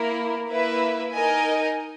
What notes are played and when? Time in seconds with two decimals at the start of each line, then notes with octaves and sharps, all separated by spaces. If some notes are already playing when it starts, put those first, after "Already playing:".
Already playing: A#3 E4 A#4
0.48 A#3 E4 B4 E5
1.13 D#4 A#4 D#5 G#5